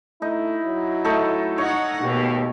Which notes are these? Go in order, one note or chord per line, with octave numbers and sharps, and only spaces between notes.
A3 D#4 E4
F#3
A3 D#4 A4
D#4 C#5 F#5
D#2 B2 G4